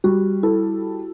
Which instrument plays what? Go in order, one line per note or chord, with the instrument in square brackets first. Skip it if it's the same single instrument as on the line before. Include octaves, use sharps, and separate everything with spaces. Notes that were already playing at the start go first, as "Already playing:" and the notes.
[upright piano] G3 [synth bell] F#4
[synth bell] E4 [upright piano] A4